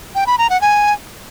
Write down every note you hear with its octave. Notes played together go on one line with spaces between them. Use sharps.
G5
B5
A#5
F#5
G#5